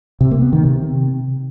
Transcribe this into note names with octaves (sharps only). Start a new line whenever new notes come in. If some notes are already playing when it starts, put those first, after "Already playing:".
C3
A#3
B3
D#3
C3